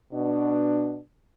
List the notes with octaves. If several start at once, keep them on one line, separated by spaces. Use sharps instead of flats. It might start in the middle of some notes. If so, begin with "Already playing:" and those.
B2 D4